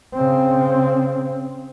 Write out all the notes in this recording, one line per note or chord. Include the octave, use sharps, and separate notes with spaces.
C#3 C4